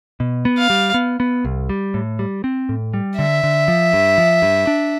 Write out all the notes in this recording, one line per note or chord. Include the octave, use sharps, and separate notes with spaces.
B2
B3
F5
G3
B3
B3
C2
G3
A2
G3
C4
A2
G3
D3 E5
D3
F3
G2
F3
G2
D4